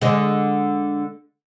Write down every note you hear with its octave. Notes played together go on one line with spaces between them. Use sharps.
D3 G#3